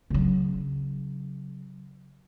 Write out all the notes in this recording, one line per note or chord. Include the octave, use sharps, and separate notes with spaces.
C#3 F#3